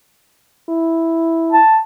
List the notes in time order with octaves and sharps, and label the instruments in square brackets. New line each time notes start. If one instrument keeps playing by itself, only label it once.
[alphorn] E4
[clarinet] A5